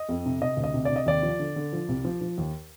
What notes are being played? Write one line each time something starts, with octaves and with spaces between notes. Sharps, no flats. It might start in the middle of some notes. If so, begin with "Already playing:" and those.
Already playing: D#5
F2
C3
C3 D#5
D2
D#5
C3
C3 D5
D#5
D#2 D5
F3
D3
D3
F3
C2
F3
F3
D#2